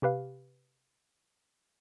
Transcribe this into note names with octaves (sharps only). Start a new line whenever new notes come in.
C3 G4 B4 F5